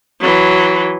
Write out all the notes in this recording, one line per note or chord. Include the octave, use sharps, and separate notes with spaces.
E3 F#3